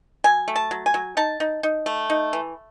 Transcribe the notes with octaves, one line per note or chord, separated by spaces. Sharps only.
F#3 G#5
A3
A5
F#3
G#5
F#3
D#4 A5
D#4
D#4
A3
D#4
E3